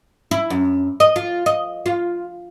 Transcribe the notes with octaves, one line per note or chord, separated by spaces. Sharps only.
E4
F#2
D#5
F4
D#5
F4